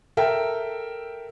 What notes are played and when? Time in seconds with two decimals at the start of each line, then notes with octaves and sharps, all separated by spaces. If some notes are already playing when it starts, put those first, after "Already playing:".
0.17 A4 A#4 E5 G5